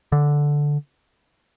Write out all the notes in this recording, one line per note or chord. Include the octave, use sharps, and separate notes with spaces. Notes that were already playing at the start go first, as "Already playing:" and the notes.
D3